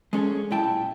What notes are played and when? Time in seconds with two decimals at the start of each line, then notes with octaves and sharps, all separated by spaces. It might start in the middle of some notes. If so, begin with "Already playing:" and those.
0.13 G#3 C#4 A4 C#5
0.51 B1 A#2 E4 G5 A5